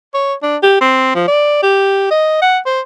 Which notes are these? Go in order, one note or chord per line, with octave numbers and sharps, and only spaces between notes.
C#5
D4
G4
C4
F3
D5
G4
D#5
F#5
C5